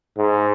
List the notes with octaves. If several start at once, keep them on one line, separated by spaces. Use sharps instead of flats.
G#2